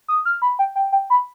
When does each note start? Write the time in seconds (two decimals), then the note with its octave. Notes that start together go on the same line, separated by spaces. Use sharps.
0.08 D#6
0.25 F6
0.42 B5
0.59 G5
0.76 G5
0.92 G5
1.10 B5